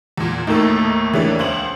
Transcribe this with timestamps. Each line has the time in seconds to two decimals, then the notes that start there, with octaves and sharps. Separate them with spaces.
0.18 E2 A#2
0.47 D#2 A2 A3 A#3 D#4 A4
1.13 E3 A3 D4 C#5
1.39 C#2 C5 F#7